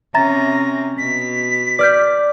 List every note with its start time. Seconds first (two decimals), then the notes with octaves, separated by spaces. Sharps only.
0.14 C3 C#4 E5 A#5 A6 A#6
0.98 B2 B6
1.79 B4 D5 F6 G6